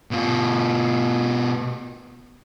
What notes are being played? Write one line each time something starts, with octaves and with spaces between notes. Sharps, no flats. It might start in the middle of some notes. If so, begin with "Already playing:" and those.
B2 F4